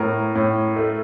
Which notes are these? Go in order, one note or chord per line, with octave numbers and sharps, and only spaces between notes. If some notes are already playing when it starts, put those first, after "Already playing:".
Already playing: A2 A#4
A2
A3